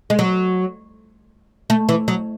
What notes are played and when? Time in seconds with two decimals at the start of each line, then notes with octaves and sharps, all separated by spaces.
0.10 G#3
0.19 F#3
1.70 A3
1.89 E3
2.08 F#3